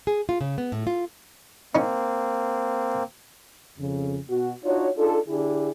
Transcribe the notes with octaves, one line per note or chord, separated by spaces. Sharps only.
G#4
F4
C#3
B3
A2
F4
A#3 C4 C#4 D#4
F2 C#3
B2 F#4
D4 D#4 F4 F#4 C#5
D4 D#4 F4 G#4 A4
D3 D4 E4 G4 G#4